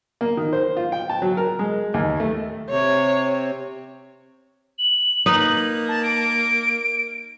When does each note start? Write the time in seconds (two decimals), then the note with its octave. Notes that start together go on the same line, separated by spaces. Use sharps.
0.21 A#3
0.37 D#3
0.53 C5
0.77 F4
0.92 G5
1.09 A5
1.22 F#3
1.37 A#4
1.59 G#3
1.94 D#2
2.20 A3
2.70 C3 C#5
4.78 F#7
5.26 A#3 D#4 B4
5.88 A5
6.03 D7